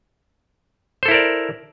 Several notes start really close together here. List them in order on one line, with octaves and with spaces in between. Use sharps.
C5 A4 E4 A#4 D5